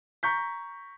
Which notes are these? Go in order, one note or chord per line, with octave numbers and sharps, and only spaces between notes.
A#5 C#6 G6 B6